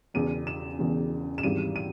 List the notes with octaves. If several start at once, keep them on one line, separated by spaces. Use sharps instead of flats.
E1 E2 C#3 E3 D#7
E7
E1 E2 C#3 E3
E7
G#1 G#2 E3 G3 D#7
D#7